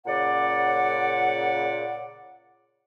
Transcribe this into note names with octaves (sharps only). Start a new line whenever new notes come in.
A#2 C#3 D5 F#5